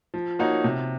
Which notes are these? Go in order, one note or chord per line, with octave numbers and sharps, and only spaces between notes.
F3
A#3 D#4 F#4 C#5
C3